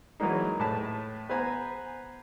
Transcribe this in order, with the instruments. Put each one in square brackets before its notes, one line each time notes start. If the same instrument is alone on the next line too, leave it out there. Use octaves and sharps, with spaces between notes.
[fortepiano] E3 F#3 G#3 A#3 D#4
A2 B4 A5
B3 B4 C5 G#5 A#5